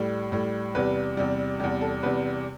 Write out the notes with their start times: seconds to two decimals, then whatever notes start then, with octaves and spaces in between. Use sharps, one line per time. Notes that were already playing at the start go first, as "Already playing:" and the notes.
Already playing: A2 G3
0.32 A2 G3
0.75 E2 C3 G3 B4
1.17 E2 C3 G3
1.60 E2 C3 G3 G4
1.81 A4
2.03 E2 C3 G3 B4